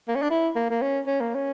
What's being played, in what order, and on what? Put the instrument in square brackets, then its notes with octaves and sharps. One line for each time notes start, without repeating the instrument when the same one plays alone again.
[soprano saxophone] A#3
C#4
D4
E4
A#3
A#3
C#4
C#4
A#3
C#4